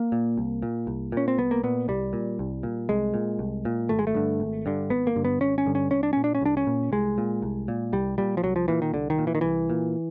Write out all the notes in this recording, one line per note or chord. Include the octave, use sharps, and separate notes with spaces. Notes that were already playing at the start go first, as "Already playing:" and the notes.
Already playing: A#3
A#2
C2
A#2
C2
A#2 C#4
C4
C2 B3
A#3
A#2 B3
C2 G3
A#2
C2
A#2
C2 G#3
A#2
C2
A#2
G#1 A3
G#3
A3
G2 D3
G#1
G2 D3
G#1 B3
A#3
G2 D3
B3
G#1 C#4
C#4
G2 D3
C#4
C2 C#4
D4
A#2 C#4
D4
C#4
C2 D4
C#4
A#2
C2 G#3
A#2
C2
A#2
C2 G3
A#2 G3
F3
C2 F#3
F3
A#2 E3
D#3
C2 D3
D#3
A#2
E3
D#3
C2 E3
A#2